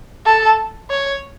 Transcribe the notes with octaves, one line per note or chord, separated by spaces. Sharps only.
A4
C#5